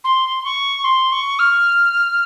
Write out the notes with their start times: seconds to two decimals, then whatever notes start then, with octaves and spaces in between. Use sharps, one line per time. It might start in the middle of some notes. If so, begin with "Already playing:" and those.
0.04 C6
0.44 C#6
0.84 C6
1.12 C#6
1.39 F6